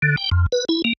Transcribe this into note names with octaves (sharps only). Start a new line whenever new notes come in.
D3
G5
F2
B4
E4
A#3